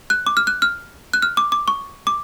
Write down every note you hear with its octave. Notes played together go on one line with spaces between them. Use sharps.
F#6
D6
F6
F#6
F6
F#6
F6
D6
D6
C#6
D6